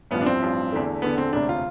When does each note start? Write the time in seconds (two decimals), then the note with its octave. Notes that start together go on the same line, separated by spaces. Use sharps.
0.11 A1 G2 F3 B3
0.21 D4
0.26 C4
0.41 A1 G2 F3
0.72 E2 D3 A3
1.02 E2 D3 A3 B3
1.18 C4
1.33 E1 D2 C3 D4
1.49 F4